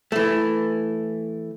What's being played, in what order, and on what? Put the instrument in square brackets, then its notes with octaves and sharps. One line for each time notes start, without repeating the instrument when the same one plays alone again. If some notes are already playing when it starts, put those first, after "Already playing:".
[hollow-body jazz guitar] E3 A3